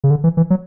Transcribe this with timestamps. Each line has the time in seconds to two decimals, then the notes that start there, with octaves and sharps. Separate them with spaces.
0.04 C#3
0.10 D3
0.24 E3
0.37 E3
0.50 F#3